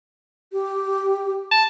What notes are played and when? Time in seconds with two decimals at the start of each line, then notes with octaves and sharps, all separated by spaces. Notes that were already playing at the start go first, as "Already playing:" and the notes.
0.52 G4
1.51 A5